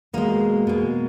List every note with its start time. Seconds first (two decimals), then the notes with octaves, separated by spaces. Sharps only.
0.13 B2 G#3 A#3
0.67 B2 G#3